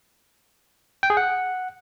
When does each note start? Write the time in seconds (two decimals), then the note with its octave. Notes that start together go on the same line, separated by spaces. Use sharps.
1.03 G5
1.10 G#4
1.17 F#5